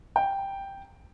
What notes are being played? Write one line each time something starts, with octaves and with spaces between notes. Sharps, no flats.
G5